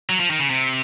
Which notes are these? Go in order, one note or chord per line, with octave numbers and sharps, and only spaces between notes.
F#3
F3
D#3
C#3
C3